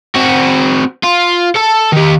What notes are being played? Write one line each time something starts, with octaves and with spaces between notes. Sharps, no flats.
C4 F#4
F4
A4 A5
D#3 G4